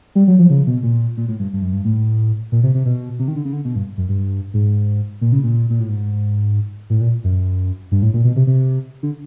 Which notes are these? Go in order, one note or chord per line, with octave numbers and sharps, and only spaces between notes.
G3
F#3
F3
C#3
B2
A#2
A#2
A2
G2
G2
F#2
G2
A2
A#2
C3
C3
B2
C3
D#3
D3
C#3
D3
B2
G2
F#2
G2
G#2
A#2
C#3
A#2
A#2
A2
G#2
A2
A#2
F#2
G2
A2
A#2
B2
C3
C3
D3